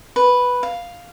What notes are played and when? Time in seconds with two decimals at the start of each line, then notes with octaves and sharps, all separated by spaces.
0.16 B4
0.63 F5